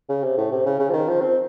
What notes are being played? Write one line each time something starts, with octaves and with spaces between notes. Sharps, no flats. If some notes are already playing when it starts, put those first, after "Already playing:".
C#3
C3
A2
C3
C#3
C#3
F3
D#3
F3
C4